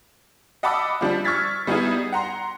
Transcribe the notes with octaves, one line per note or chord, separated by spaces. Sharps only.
D#5 F#5 A5 B5 D6 E6
F3 G3 D4
C#6 E6 F6 G#6 A6 B6
G3 B3 D#4 E4 G#4
F#5 A#5 C6